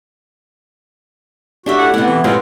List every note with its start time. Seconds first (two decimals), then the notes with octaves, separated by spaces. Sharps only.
1.66 D4 F#4 G4 E5
1.77 A2 F#5
1.94 C3 A3 B3 E4
2.07 E3
2.24 F#2 A2 C3 G#3 C4 F4